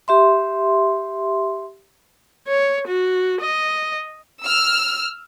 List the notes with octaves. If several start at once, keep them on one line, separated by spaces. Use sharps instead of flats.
G4 E5 C6
C#5
F#4
D#5
E6 F6